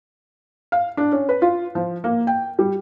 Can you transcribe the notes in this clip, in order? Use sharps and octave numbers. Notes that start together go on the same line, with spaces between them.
F5
D4
C#4
B4
F4
F3
A#3
G5
G3